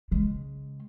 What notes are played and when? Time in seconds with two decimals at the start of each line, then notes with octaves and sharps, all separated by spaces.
0.11 C#3 G#3